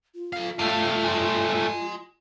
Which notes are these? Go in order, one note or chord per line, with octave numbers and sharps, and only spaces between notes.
F4
A4 F5
G2 A3 F5
G#5 C6